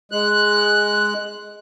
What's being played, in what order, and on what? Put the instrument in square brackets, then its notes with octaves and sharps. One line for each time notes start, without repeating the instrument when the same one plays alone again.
[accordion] G#3 F#6